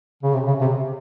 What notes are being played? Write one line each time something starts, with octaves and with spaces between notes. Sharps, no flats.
C#3
C3
C#3
C3